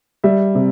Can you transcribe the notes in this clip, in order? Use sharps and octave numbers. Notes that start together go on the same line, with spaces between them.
G3 E5
C3